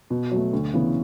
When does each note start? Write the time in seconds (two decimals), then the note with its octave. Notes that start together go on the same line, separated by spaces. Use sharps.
0.10 B2
0.31 F#3 A3
0.53 D2
0.74 C#3 E3 B3